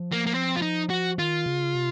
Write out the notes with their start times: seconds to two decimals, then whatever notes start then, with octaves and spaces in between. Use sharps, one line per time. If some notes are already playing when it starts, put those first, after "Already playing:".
Already playing: F3
0.12 A#3
0.26 A#3
0.34 C4
0.56 F4
0.62 D#4
0.90 F#4
1.18 D#3 F4
1.46 C#3
1.75 C3